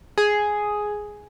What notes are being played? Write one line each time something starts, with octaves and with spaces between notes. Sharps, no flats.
G#4